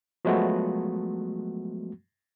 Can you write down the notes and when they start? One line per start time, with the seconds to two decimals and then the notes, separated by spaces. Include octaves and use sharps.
0.25 F3 F#3 G#3 A3 B3 F#4